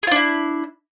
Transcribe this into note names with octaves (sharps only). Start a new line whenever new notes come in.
D4 E4 F4 G#4